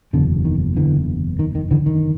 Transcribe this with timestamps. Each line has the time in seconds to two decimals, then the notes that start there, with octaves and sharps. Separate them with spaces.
0.13 F#1 E2 B2 D3
0.45 D#3
0.76 D3 E3
1.39 D#3
1.55 D#3
1.71 D3 E3
1.86 D#3